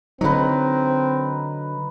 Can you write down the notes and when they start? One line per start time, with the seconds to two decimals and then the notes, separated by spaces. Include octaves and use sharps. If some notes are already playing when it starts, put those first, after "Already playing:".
0.21 D3 F#3 C4 D#4 B4